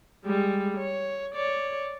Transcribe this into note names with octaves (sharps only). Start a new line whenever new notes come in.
G3 G#3
C#5
C#5 D5